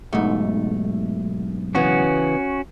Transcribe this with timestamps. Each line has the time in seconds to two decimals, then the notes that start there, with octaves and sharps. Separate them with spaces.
0.13 B1 G#2 A3
1.75 C#3 E3 B3 C#4 F#4